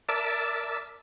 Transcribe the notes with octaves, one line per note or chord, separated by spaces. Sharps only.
A#4 D5 E5 A5 D6 E6